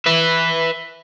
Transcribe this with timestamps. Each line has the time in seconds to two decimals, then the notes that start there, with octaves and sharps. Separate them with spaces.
0.06 B4 E5